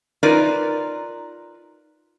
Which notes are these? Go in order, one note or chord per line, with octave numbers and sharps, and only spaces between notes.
D#4 F4 A#4 B4 D5